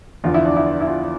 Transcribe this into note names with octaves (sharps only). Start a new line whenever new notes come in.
E2 D3 F3 F4
E4
D4
E4
E4
F4